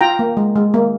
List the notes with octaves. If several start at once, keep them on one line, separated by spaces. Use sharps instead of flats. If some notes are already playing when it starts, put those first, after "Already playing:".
F4 G5 A#5
A#3
G#3
G#3
A#3